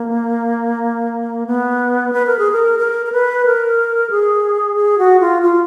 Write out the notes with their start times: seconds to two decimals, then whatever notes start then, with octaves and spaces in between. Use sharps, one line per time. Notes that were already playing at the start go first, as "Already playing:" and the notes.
Already playing: A#3
1.47 B3
2.13 B4
2.27 A#4
2.39 G#4
2.52 A#4
2.79 A#4
3.06 A#4
3.12 B4
3.46 A#4
4.10 G#4
4.76 G#4
4.98 F#4
5.20 F4
5.42 F4